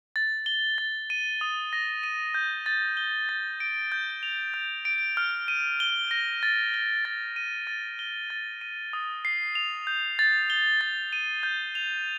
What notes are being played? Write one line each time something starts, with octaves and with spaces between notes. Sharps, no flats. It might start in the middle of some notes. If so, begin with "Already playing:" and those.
A6
G7
A6
D#7
D#6
A#6
D#7
G6
A6
G7
A6
D7
G6
F7
G6
D7
F6
D#7
G7
A#6
A6
G7
A6
D#7
A6
G7
A6
D#7
D#6
C7
F7
G6
A6
G7
A6
D#7
G6
F7